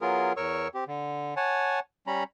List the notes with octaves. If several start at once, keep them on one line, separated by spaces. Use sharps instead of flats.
F#3 B3 F4 G#4 A#4
E2 A#4 C#5 C#6 E6
C4 G4
D3
C#5 F#5 G#5 A5
G3 C#4 A#5 B5